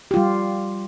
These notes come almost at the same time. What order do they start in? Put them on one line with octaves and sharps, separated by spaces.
G4 F4 G3